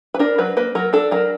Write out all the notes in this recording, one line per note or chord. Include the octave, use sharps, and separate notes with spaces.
B4
D4 A#4
F#3 B4
A#3 B4
F#3 A#4
D4 A4
F#3 A#4